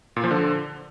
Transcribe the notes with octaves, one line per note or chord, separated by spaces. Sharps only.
A#2
F3
D3